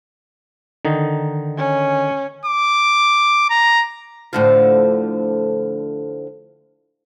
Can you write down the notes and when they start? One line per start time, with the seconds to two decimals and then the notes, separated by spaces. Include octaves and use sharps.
0.85 D3 D#3 D#4
1.58 C#4
2.45 D6
3.50 A#5
4.33 A2 D3 F3